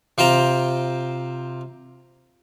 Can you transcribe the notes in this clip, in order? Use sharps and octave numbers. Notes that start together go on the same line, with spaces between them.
C3 F4 C5 G5 A#5